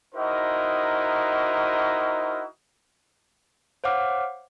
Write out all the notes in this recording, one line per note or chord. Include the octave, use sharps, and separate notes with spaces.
D#4 E4 F#4 A#4 C5 D#5
C5 C#5 F5 F#5 D6 F6